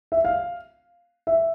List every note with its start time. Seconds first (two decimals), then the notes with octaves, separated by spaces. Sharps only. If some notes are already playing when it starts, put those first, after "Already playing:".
0.12 E5
0.25 F5
1.27 E5